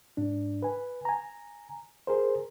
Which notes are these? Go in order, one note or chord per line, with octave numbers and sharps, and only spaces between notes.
G#2 D4
B4 G#5
G#5 A#5
G#4 A#4 C5